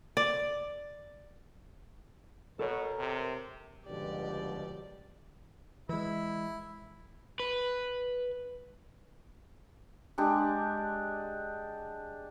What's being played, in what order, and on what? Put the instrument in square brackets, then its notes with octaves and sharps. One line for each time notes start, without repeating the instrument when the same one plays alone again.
[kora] D5
[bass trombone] B2 [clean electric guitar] A4 C#5 [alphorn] A#4
[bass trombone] C3
[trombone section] C#2 G2 B2 [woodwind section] D3 D#3 F3 [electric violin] G4 D5
[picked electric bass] E3 G#3 [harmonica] E4
[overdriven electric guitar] B4
[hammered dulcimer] G#3 D4 G4 D6